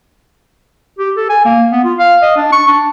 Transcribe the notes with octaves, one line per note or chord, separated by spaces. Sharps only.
G4
A4
G#5
A#3
B3
F4
F5
D#5
D4
C#6
D4